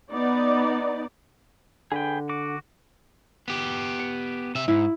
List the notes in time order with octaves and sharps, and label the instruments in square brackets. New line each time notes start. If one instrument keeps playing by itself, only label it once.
[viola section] B3 D#4 D5
[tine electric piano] D3 [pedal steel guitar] G#4 B4 G5
[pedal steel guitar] F#4 D6
[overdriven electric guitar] B3 G4
[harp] C#7
[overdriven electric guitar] C3 E5
[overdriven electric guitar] G#2 [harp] E4